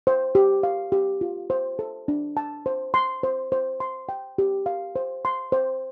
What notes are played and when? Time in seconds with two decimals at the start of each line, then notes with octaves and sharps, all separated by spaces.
0.07 C5
0.35 G4
0.63 F5
0.92 G4
1.21 F4
1.50 C5
1.79 A4
2.08 D4
2.37 A5
2.66 C5
2.94 C6
3.23 C5
3.52 C5
3.80 C6
4.09 G5
4.38 G4
4.66 F5
4.96 C5
5.25 C6
5.52 C5